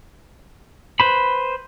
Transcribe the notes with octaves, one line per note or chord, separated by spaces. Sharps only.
B4 C5 B5